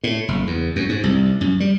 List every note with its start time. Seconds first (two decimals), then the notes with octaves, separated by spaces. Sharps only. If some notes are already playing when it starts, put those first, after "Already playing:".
0.04 A2
0.28 F#1
0.47 E2
0.76 F#2
0.89 G#2
1.04 C2
1.41 F#2
1.60 G3